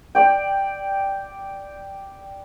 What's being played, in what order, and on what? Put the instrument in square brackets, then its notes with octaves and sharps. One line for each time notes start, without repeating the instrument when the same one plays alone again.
[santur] D5 G5